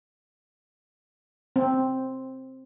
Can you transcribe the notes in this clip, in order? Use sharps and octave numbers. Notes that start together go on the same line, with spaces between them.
C4